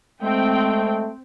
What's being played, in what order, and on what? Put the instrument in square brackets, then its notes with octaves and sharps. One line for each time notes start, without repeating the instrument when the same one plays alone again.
[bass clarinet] G#3 [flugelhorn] A3 [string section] C4 G5